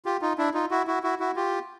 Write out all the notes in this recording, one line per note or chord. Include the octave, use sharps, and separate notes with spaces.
F4 G4
D#4 F4
D4 E4
D#4 F4
E4 F#4
E4 F#4
E4 F#4
E4 F#4
F4 G4